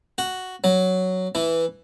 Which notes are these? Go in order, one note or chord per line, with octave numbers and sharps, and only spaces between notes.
F#4
F#3
E3